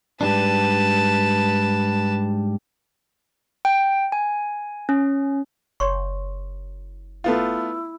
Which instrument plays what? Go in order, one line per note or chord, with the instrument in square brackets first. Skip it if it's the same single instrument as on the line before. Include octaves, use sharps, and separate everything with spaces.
[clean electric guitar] G#2 G3 D4 [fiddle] B4 A5
[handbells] G5
G#5
C#4
[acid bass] F#1 [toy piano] C#5 C6 C#6
[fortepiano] A3 B3 F4 [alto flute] E4